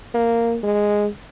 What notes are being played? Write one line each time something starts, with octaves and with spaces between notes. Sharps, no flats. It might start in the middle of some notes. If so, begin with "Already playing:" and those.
A#3
G#3